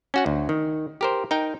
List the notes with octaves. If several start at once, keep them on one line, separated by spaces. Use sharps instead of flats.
C#4 F#4 F#5
D2
D#3
G4 A#4 C5
D#4 A#4 G5